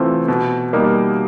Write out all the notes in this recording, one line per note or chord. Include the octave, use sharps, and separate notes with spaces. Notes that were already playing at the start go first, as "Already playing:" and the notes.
Already playing: C3 E3 A3 C4 F4
B2
G3 A#3 D#4